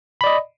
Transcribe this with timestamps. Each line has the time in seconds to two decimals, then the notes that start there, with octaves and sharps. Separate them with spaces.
0.21 B5
0.24 D5
0.27 D#5